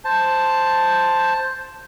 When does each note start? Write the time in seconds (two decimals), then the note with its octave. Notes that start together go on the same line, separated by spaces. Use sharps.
0.05 C5 A5